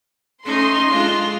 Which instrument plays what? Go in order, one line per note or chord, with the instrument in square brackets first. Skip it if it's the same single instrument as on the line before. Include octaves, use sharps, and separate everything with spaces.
[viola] A3 D#4 [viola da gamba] C#4 [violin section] C6
[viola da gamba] G#3 F4 [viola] D4